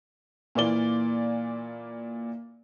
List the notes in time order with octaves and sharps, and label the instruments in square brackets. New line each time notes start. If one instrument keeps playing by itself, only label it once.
[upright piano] A#2 E3 A#3 D5 G7